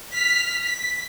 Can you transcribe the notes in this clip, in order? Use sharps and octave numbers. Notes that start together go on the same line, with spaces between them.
F6 B6
B6